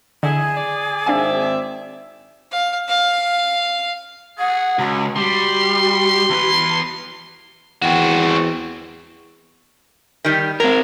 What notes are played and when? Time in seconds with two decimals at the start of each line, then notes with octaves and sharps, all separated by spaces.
0.23 D3 E4 G#4
0.57 D5
1.07 G#1 C4 D4 E5 F5 G#5
2.52 F5
2.89 F5
4.39 G#4 F#5
4.79 C#2 F#4
5.17 G3 F#4 C6
6.30 E2 B4
7.82 E2 C4 F#4
10.25 D#3 G3
10.60 F#3 C4 A#4